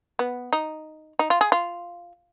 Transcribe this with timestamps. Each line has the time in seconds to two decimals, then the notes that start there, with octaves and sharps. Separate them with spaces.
0.19 B3
0.53 D#4
1.19 D#4
1.30 F4
1.41 G#4
1.52 F4